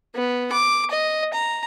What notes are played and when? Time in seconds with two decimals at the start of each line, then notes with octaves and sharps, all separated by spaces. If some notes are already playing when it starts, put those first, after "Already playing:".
0.15 B3
0.52 D6
0.91 D#5
1.33 A#5